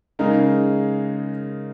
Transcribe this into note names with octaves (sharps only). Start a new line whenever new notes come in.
C#3 G#3 D#4 A#4